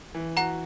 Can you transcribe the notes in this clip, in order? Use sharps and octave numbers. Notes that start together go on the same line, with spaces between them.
E3
F#4 F#5 A#5